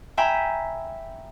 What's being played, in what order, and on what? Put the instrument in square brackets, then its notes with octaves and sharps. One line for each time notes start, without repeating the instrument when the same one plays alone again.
[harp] E5 G5 G#5 A#5 B5